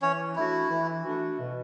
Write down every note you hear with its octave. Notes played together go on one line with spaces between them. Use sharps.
E3 C#4 C#5
A3 D4 E4 F#4
E3
A3 D4 F#4
B2